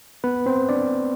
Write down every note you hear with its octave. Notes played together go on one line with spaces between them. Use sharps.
B3 B4
C4 C5
D4 D5